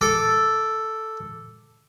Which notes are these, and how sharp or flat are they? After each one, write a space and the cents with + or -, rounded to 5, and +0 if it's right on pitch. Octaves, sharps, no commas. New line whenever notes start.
A4 +0 D6 +0